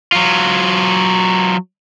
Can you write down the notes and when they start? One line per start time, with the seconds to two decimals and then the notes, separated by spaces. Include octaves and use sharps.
0.12 F#3 F4